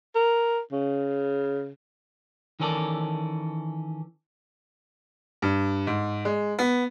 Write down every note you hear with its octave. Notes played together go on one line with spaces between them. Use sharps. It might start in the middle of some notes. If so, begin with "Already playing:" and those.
A#4
C#3
D#3 E3 C#4 A4 A#4 D5
G2
G#2
G#3
B3